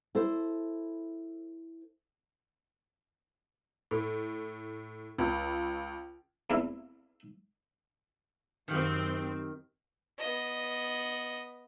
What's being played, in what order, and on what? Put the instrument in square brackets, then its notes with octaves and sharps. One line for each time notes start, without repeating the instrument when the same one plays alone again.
[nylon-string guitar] E4 A4 C5
[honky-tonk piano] A2
C#2
[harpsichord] E2 C3 E3 E5
[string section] F#2 C4 [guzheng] D#3 G4
[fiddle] B3 D#5